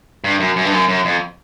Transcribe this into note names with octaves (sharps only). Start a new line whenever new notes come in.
G2
F#2
F#2
G2
F#2
F#2
F2